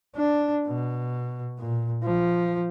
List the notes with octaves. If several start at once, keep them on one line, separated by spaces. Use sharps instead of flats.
D4
B2
A#2
F3